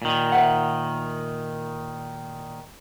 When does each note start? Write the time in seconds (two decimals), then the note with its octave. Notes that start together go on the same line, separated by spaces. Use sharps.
0.02 A#2 D#3
0.32 C5 E5 F#5